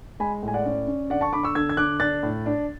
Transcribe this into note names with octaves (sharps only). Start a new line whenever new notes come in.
G#3 G#5 B5
A2
G#5
D5 F#5
C#4 D5
C#4
D3 D5 F#5
A5 C#6
D3 B5 D6
C#6 E6
D3 E6 G#6
G#6
D3 D6 F#6
D4 F#6 A6
A2
D4